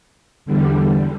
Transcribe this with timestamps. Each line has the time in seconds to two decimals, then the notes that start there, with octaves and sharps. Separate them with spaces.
0.45 E2 D3 G3